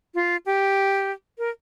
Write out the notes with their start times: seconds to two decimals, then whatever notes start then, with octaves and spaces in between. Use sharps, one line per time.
0.15 F4
0.46 G4
1.38 A#4